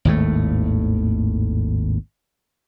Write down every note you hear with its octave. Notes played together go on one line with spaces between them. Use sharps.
G#1 D#2 A2 A3